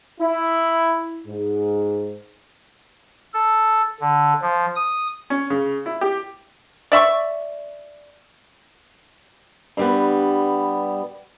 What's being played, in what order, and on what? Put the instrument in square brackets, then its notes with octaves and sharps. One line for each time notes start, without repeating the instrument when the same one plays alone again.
[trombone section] E4
G#2
[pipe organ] A4
D3
F3
D#6
[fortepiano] C#4
C#3
E4
G4
[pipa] D5 E5 C6 C#6
[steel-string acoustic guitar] G2 G3 B3